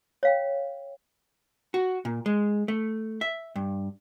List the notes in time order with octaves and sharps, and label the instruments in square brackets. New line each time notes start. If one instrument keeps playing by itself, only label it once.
[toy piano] C#5 F5 G5
[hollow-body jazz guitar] F#4
A#2
G#3
A3
E5
G2